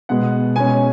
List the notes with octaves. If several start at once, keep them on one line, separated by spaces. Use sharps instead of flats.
B2 G#3 B3 F#5
B2 G#3 C#4 G#5